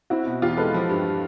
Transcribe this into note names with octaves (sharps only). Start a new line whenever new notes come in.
C4 E4 F#4
B2
E2 F4 G4
G#3 A4 B4
F3
G2